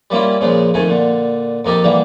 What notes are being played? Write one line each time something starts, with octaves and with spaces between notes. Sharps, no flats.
G3 A#3 C#4 E4 F4
A#2 C#3 F3 G#3
F2 D#3 A3 G#5
A#2 D3
F2 A#3 D#4 G4 A4
D3 E3 G3 A#3